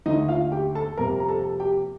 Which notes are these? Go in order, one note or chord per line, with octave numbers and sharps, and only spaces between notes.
D#2 D3 A3 D#4 D#5
F4 F5
G4 G5
A4 A5
F2 C3 G3 A#3 A#4 A#5
A#5
A4 A5
G4 G5